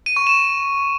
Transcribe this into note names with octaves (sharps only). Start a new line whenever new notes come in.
D#7
C#6
E7